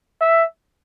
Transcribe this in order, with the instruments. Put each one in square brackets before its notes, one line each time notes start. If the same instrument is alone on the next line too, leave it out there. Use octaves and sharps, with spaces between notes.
[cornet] E5